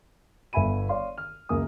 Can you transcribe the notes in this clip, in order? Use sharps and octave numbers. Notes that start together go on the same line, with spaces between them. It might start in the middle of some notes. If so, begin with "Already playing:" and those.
G1 B3 E5 G#5 B5 D#7
C#5 D5 F5 C6
F6
C#2 F#2 A#3 G#5 D#6